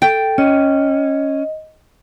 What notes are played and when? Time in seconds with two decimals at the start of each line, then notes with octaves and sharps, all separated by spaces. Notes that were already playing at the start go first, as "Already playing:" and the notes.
0.02 A4 G5
0.38 C#4 D#5